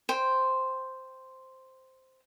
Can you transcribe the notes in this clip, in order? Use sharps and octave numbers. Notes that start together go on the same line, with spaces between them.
C5 G5